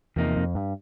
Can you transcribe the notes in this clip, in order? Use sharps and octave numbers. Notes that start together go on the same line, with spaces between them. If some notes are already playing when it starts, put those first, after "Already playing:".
E2 C3 F3 A#3 D#4
F2
G2